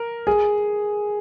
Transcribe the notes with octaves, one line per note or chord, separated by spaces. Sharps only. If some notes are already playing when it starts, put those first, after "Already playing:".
Already playing: A#4
G#4